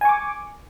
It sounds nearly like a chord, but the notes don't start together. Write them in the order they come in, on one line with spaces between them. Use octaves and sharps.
G#5 C#6 D6